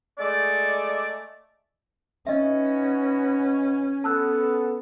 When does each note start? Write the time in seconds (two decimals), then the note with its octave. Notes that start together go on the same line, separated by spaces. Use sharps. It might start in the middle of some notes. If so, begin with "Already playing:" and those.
0.19 G#3 A3 D5
2.27 C#4 D#4 F#4 B4 D#5 E5
4.04 B3 A4 A5 E6 F#6